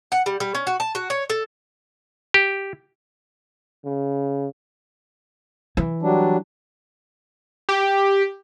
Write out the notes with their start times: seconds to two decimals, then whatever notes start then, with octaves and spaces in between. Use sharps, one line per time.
0.12 F#5
0.26 G3
0.40 G3
0.55 C#4
0.67 F#4
0.80 A5
0.95 F#4
1.10 C#5
1.30 A4
2.34 G4
3.85 C#3
5.77 E3
6.02 F#3 G3 D4
7.69 G4